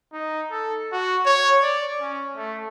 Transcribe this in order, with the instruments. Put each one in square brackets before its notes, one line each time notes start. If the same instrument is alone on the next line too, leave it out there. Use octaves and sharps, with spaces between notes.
[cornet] D#4
A4
F#4
C#5
D5
C#4
A3